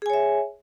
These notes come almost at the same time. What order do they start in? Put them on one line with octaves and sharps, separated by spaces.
G#4 G#5 C#5 E5